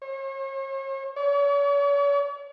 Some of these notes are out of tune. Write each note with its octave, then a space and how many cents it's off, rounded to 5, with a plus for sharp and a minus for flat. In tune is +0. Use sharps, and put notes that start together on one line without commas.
C#5 -45
C#5 +40